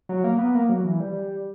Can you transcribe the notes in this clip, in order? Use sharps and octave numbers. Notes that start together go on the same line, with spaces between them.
F#3
A#3
B3
A#3
F#3
E3
G3